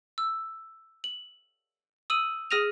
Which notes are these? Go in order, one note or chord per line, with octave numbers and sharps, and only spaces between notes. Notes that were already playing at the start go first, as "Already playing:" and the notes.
E6
F#7
D#6 E6 D#7 F#7
G#4 D#6 F6 A#6 D#7 F7